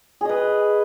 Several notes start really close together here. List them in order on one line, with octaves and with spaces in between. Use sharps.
G#4 D#5 B4